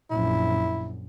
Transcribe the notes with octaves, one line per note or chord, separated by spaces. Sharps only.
A#1 F#2 E4